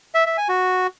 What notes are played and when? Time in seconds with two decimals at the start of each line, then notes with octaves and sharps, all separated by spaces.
0.15 E5
0.26 E5
0.37 G#5
0.49 F#4